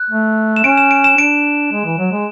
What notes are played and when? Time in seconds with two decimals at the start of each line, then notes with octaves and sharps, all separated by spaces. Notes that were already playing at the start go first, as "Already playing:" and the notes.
Already playing: F#6
0.10 A3
0.56 E7
0.64 C#4 D7
0.78 E7
0.91 D7
1.04 E7
1.18 D4 D7
1.71 G#3
1.85 E3
1.98 F#3
2.12 G#3